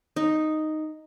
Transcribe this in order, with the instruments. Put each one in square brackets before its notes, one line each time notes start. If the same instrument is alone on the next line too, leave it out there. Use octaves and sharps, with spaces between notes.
[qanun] D#4